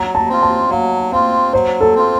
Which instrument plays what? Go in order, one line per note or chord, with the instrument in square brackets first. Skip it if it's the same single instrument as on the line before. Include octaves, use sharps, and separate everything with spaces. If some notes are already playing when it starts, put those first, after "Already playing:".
Already playing: [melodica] F#3 [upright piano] A#5
[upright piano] A5
[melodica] C4 F4
[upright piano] A5
[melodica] F#3 [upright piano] F5
[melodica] C4 F4 [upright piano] F5
[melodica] F#3 [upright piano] C5
[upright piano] A4
[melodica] C4 F4